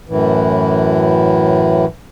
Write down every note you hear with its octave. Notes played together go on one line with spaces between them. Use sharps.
F#2 A2 E3